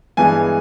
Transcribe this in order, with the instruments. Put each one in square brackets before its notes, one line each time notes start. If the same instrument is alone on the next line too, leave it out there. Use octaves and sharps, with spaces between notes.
[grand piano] G2 E3 G#3 B3 D4 G#5